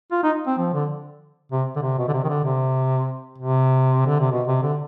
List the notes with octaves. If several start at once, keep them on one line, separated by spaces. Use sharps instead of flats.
F4
D#4
C4
F3
D3
C3
D3
C3
B2
D3
C3
D#3
D3
C3
C3
D3
C3
B2
C3
D3